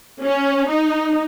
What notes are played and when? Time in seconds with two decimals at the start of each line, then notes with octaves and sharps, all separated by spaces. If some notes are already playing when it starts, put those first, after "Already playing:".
0.24 C#4
0.70 D#4